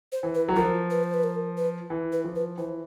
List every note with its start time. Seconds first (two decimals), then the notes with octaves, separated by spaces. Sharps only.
0.12 C5
0.23 E3
0.35 B4
0.49 F#3
0.56 F3 A#4
0.90 B4
1.04 C5
1.14 B4
1.24 A#4
1.57 B4
1.90 E3
2.12 B4
2.24 F3
2.36 B4
2.58 E3 C5